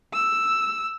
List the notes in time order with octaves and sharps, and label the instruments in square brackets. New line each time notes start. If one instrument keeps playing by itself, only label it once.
[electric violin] E6